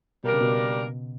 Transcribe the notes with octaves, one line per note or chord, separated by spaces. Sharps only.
B2 G3 A#3 D4 A#4
C#3
B2